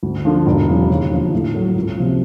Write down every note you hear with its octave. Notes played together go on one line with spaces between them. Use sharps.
D2
D3 F3
E1
E2 C#3 F#3
D#2
D3 F3
A2
F#3 A3
C#2
C3 F3